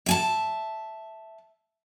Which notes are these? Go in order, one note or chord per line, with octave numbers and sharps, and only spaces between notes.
E5 G#5 A5